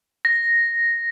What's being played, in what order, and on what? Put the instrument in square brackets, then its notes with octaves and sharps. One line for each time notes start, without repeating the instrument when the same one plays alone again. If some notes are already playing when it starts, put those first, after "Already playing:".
[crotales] A#6